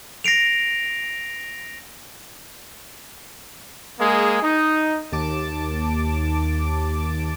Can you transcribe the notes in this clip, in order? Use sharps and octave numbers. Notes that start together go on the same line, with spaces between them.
A#6 C7 D7 F7
G#3 A#3 G#4
D#4
D#2 A5 D6